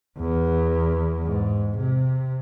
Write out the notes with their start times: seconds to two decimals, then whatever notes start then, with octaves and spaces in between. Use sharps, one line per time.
0.18 E2
1.24 G#2
1.77 C3